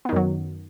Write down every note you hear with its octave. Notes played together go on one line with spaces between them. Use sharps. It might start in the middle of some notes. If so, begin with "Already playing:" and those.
F#2 D#3 F#3 B3